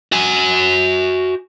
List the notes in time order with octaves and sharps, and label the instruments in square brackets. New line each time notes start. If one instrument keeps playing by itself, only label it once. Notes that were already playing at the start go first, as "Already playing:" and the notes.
[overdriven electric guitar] F#4 G#5